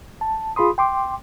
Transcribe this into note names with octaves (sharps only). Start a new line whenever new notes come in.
A5
F4 G#4 B5 C6 D#6
G5 C6 D6